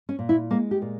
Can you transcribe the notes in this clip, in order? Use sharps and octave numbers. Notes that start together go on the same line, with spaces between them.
C#4
A#2
E4
G#3 A#3
G4
A#2